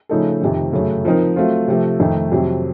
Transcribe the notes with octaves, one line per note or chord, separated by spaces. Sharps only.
C#3 F3 A3 D#4 A4
F2 C3 D#3
F#2 C#3 A3
F3 C4 D#4 A#4
F#3 A3 C4 F4
C3 F3 A3
F2 D#3 A3 D#4
F2 C3 F#3 C4